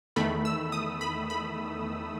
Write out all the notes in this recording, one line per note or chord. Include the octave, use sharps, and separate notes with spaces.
E2 D#3 A3 B5
E6
D#6
B5
B5